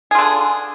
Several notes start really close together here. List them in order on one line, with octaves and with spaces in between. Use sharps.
G#4 F4 D3